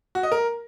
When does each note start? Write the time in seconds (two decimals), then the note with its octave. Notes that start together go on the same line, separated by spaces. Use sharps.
0.15 F#4
0.23 D#5
0.32 A#4